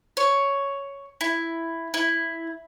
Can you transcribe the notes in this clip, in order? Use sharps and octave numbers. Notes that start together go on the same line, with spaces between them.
C#5
E4
E4